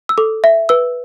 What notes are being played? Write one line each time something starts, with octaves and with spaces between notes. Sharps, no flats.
E6
A4 D6
E5
B4 E6